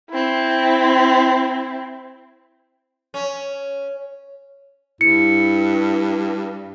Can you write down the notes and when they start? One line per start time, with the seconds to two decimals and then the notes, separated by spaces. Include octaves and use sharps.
0.11 C4 E4
3.14 C#4
5.01 G2 E4 C#7